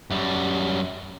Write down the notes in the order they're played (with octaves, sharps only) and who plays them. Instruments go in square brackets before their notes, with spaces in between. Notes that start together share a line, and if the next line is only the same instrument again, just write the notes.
[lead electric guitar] F#2 G3